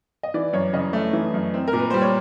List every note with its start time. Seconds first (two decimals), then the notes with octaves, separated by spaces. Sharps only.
0.23 D#5
0.34 E3 D5
0.53 F#2 C#5
0.73 C#3 D#5
0.93 A3
1.13 E3
1.34 F#2
1.54 C4
1.68 A#4
1.73 A#2
1.80 B4
1.90 G3 C5
2.02 C#5